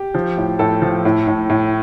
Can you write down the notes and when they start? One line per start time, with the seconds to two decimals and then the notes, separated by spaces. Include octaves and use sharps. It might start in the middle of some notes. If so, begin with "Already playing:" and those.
Already playing: G4
0.15 F3
0.37 A2
0.59 A2 A4
0.82 F3
1.05 A2
1.27 A2
1.49 A2